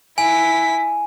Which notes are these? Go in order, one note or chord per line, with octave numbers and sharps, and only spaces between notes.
E4 G#5 B6